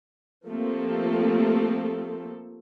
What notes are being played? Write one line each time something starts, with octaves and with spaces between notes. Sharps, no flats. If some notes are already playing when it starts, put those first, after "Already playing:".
F3 A3 A#3 C4 G4 A4